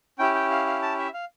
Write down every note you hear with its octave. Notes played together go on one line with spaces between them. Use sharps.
C#4 E4 G4 G5
G5
F5
F5
A5
E5
F5